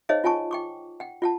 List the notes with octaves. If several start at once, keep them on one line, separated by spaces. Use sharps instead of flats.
D#4 G#4 C5 C#5 D#5 F5
F4 F#5 G#5 A5 C#6
G5 C#6 D6
F#5 G5
F4 F#5 A5